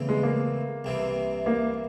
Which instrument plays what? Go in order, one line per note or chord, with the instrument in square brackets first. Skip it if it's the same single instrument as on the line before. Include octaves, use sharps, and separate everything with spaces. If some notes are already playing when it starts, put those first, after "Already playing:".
Already playing: [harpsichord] E2 C#3 E3 A3 C4
[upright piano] G#3
A#3
[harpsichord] C2 C3 E3
[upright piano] A#3